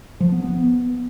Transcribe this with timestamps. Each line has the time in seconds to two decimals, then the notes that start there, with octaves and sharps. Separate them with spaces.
0.20 F3
0.32 B3
0.43 B3